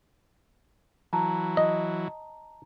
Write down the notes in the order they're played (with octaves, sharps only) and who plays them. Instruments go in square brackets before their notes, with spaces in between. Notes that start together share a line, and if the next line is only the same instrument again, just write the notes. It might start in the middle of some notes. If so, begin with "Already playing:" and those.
[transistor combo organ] E3 F#3 [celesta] A5 A#5
[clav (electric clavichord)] D#5